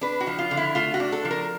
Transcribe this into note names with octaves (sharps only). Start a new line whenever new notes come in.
D4 B4
F#4
F3
F4
D3
E4
A3 F4
F#4
D4
A4
F3
A#4